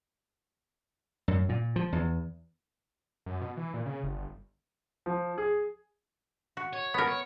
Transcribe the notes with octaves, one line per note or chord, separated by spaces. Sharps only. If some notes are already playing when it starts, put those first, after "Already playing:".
F#2
A#2
F3
E2
F#2
B2
E3
A#2
C#3
G1
F3
G#4
F#4
C#5
B3 A#4
C#5